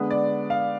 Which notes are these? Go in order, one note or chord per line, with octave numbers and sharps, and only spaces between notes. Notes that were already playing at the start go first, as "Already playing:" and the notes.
Already playing: D3 G#3 B3
D5
F5